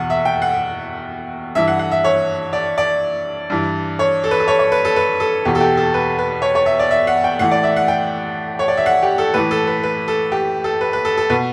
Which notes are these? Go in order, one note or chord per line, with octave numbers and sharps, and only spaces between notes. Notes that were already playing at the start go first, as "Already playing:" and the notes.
Already playing: E2 B2 F#5
E5
G5
F#5
G2 E3 E5
F#5
F#5
E5
C#5
D5
D5
G2 E3
C#5
A4
B4
A4
C#5
C#5
B4
A4
B4
A4
E2 B2 G4
A4
G4
A4
B4
B4
C#5
C#5
E5
D5
E5
F#5
G5
A2 E3 F#5
D5
E5
F#5
G5
C#5
D5
E5
F#5
G4
A4
A2 E3 B4
A4
B4
B4
A4
G4
A4
B4
B4
A4
A4
B2 B4